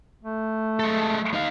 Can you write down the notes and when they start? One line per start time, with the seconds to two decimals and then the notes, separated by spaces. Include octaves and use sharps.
0.23 A3
0.80 G#3 A4
1.34 D#4 F5